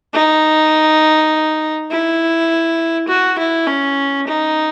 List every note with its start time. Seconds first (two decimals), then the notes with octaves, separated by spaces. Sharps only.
0.13 D#4
1.91 E4
3.08 F#4
3.38 E4
3.67 C#4
4.27 D#4